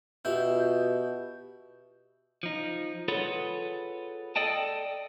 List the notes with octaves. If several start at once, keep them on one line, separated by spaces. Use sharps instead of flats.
B2 E4 F4 G4 G6
F3 D#4
F4 G#4 A4 B4 C#5 F#5
A4 D5 D#5 G5 A5